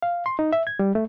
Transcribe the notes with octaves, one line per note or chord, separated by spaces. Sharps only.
F5
C6
D#4
E5
G#6
G3
A3